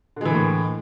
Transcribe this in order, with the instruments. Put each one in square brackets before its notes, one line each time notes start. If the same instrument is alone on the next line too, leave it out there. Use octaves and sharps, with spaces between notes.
[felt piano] D3
G#3
E3
A#3
A2